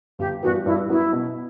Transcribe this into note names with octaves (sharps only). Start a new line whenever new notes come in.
G1 G4
G2 E3 B3 F#4
G2 E4
F#3 B3 E4 F#4
B2